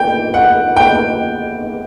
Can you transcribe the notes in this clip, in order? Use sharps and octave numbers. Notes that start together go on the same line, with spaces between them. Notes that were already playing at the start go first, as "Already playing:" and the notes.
Already playing: G5
F#5
G5